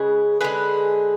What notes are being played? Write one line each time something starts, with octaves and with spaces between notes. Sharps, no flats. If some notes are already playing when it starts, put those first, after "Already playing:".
Already playing: C#3 G#3 G#4 B4
D3 G#3 G#4 B4